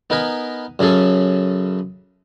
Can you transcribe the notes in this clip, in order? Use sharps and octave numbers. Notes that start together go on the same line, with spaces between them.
B3 D#4 A#4 B4 G#5
F#2 C#3 C#4 G#4 A4